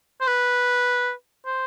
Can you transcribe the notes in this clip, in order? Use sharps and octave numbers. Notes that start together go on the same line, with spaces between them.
C5
B4
C5